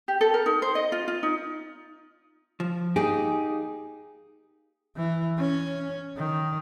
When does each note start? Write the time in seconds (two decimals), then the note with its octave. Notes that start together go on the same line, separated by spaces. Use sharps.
0.08 G4
0.21 A4
0.34 A#4
0.46 D#4
0.62 C5
0.75 D#5
0.92 F4
1.08 F4
1.23 D#4
2.60 F3
2.96 A#3 D#4 G4 G#4
4.97 E3
5.38 C#4
6.17 D#3